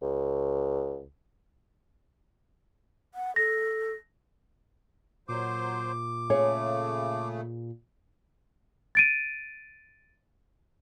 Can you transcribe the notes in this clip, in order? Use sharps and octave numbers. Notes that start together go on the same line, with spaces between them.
C#2
F#5
A4 A#6
A#2 F#3 C5 D6
C#3 A3 G#4 C#5
A6 D7 D#7